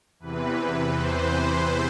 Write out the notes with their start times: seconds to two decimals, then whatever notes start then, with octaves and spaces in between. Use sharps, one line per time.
0.19 E2 C3 E3 B4
0.92 C5
1.29 C5